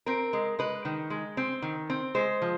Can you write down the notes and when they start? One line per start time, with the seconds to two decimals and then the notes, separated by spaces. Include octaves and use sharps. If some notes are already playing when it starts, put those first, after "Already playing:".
0.06 C4 A#4
0.33 G#3
0.59 G#3 B4
0.85 D#3
1.10 G#3
1.37 C4
1.62 D#3
1.90 C4
2.15 G#3 C5
2.42 F3